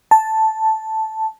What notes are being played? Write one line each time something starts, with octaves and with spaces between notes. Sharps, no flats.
A5